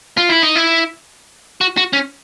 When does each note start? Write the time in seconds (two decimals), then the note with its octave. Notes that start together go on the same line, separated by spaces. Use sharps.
0.17 F4
0.29 E4
0.42 D#4
0.56 E4
1.61 F#4
1.77 F#4
1.93 C#4